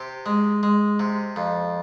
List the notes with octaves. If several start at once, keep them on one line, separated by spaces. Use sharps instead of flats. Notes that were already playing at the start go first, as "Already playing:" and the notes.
Already playing: C3 G4
G#3
G#3
C3
F2